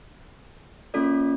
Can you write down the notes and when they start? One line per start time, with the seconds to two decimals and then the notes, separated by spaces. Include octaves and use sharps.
0.94 A#3 C#4 F4 A4 D5